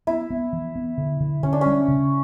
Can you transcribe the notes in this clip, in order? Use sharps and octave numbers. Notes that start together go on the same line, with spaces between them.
B3 E4
B3
E3
B3
D3
D3
D3 C#4
D4
G3 C#4
C#3